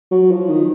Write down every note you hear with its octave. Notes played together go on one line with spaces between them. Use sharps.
F#3
F3
D#3